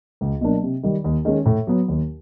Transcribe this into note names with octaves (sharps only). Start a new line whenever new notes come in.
C#2
B2 F#3 A#3 D4
C3
D#3 G3
D#2
D#3 G#3 C#4
A2
F#3 B3
D#2